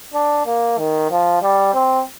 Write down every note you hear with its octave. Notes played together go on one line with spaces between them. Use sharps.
D4
A#3
D#3
F3
G3
C4